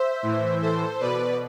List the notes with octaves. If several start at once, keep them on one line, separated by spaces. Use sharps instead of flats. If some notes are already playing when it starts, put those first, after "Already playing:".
Already playing: C5 E5
A2 E3
A4 C5
B2 B4 D5